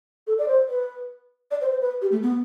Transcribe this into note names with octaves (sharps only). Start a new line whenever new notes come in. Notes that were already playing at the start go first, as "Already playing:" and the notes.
A4
D5
C5
B4
D5
C5
C5
B4
G4
A3
B3